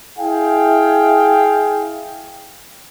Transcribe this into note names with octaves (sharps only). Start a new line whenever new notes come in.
E4 G#4 F5 G5